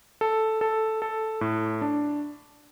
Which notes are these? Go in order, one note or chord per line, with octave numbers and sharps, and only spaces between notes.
A4
A4
A4
A2
D4